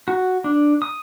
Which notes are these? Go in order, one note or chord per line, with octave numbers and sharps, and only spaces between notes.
F#4
D4
D#6